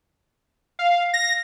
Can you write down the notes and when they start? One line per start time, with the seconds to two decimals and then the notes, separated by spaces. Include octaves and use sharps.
0.79 F5
1.13 A#6